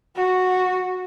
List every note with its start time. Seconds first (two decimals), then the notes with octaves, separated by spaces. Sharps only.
0.16 F#4